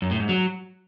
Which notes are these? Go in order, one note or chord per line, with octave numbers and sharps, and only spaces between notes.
F#2
A2
G#2
F#3